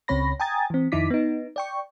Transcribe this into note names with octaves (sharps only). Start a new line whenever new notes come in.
C#2 C#3 C4 C#5 B5 A#6
G5 G#5 A#5 D#6 G#6 A6
E3 C4
F2 D#3 D#4 E4 D6 B6
B3 D#4
D5 G5 C#6